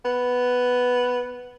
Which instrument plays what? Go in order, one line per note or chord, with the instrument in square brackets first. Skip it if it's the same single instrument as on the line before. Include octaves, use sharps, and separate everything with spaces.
[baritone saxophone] B3